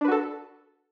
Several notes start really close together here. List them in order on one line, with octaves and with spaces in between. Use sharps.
D4 B4 F#4 A4